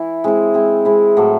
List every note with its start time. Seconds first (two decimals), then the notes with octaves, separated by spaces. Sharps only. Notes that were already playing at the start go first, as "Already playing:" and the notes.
Already playing: E3 E4
0.24 G#3 C4 E4
0.54 G#3 C4 E4
0.85 G#3 C4 E4
1.17 A2 F#3 A3